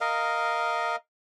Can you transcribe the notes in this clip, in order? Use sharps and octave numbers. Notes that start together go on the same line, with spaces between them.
A#4 D#5 F5